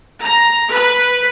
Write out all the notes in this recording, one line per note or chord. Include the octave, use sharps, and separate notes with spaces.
A#5
B4